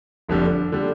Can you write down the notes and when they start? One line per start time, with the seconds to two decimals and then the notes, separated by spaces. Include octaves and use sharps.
0.29 F1 F2 D3 G3
0.72 D3 G3